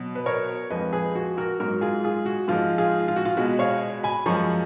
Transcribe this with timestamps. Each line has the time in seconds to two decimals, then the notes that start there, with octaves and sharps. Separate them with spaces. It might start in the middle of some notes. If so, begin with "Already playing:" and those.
Already playing: B2 F#3
0.15 B4
0.26 A#4 C#5
0.70 F2 F3 G#3 B4 D#5
0.93 G#4 B4
1.15 F#4
1.38 F#4 A#4
1.60 G#2 F#3 F#4 A#4
1.81 F4 G#4
2.04 F4 G#4
2.26 F#4
2.48 G#2 F3 G#3 F4
2.78 F4 G#4
3.08 F4
3.16 F#4
3.25 F4
3.37 B2 G#3 F#4
3.59 C#5 F5
4.04 G#5 B5
4.26 F#2 F3 G#3 A#5 C#6